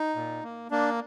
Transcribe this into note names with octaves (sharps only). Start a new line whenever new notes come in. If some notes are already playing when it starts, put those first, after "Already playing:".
Already playing: D#4
A#2
A#3
A#3 D4